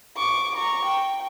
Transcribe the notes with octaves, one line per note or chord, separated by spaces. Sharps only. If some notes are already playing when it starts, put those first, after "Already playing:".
C#6 D6
A#5 C#6
G5